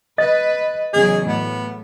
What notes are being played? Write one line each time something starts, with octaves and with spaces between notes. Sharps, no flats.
B4 D#5 A6
E2 C#3 F#3 G#4
A2 B3